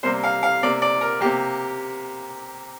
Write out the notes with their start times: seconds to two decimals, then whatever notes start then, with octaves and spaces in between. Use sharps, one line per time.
0.03 C3 G3 A#3 C5
0.24 F5
0.43 F5
0.63 C3 A#3 D5
0.82 D5
1.01 A#4
1.21 C3 A#3 G4